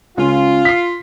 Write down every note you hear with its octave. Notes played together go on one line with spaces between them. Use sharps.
C#2 C#4 F4
B6 C7